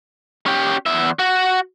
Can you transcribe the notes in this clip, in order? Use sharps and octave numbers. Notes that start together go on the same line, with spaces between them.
C#4 G4
E2 E5
F#4